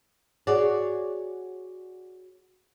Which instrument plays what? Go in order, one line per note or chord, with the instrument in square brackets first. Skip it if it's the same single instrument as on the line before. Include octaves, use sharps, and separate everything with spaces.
[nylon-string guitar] F#4 G#4 C#5 D5